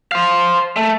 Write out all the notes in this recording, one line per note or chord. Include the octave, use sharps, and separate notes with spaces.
C5 F5
A3